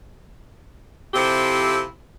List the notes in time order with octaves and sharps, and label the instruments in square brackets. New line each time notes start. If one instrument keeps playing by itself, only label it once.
[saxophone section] C3 F3 C4 E4 G4 A4